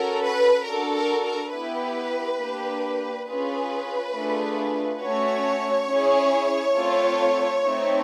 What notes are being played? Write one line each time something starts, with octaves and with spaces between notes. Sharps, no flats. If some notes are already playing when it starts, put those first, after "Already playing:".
Already playing: C#4 F#4 A4 A#4
B4
D4 F#4 A4 A#4
A#4
A#4
B3 E4 G4 B4
A#3 D4 G4
C#4 F4 G#4 B4
A3 D4 F4 G#4
A3 C#4 F#4 C#5
C#4 E4 G#4
A3 C4 F4 A4
A3 C4 D#4